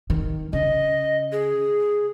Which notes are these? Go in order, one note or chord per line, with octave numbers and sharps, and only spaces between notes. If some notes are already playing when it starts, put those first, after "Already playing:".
D#3
C#3 D#5
G#4